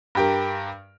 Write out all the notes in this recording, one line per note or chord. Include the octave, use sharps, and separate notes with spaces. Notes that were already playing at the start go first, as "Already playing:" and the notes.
G2 G4 A#4